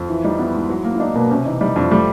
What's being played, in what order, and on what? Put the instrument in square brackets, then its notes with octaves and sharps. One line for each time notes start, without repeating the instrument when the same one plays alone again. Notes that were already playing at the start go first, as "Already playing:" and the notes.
Already playing: [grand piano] F2
[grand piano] E3 [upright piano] E4
[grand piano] G3 [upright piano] D#4
[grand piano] B3 [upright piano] E4
[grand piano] G#2
F#3
A#3
[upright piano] E4
[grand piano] D4 [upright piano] D#4
[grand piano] B2 [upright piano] A#3
[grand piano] C3 [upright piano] C#4
[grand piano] E3 [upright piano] D#4
[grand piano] G3 [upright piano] D#4
[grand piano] F2 [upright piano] D4
[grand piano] G3 [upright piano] A3